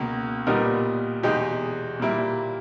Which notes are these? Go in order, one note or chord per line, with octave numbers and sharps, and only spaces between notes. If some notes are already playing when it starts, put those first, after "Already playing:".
Already playing: C#2 B2 A#3
A#2 G3 B3 D#4 A#4
E2 B2 G#3 D#4 G4
A#2 G3 A#3 E4